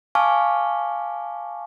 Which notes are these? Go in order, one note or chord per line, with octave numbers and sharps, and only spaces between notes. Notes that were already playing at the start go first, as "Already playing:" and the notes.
F5 G#5 A5 C#6 D6 F6